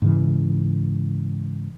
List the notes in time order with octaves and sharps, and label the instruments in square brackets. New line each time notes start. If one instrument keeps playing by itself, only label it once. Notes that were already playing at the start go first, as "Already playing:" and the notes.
[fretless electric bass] G#2 C#3 E3